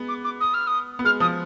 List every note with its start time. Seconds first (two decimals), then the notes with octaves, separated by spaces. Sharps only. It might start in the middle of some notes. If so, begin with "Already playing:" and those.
Already playing: G#3 B3
0.08 D6
0.25 D6
0.40 D#6
0.54 F6
0.67 D#6
0.99 B3
1.05 G#3 F6
1.20 F3 D#6